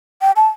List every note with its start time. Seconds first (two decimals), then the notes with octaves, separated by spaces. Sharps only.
0.21 G5
0.36 A5